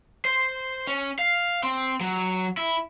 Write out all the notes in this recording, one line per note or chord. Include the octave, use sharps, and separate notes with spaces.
C5
C#4
F5
C4
F#3
E4